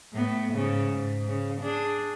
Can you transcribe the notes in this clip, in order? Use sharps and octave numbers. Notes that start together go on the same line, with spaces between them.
A2 B3
G#2 C#3
G#2
C#3
D4 G#4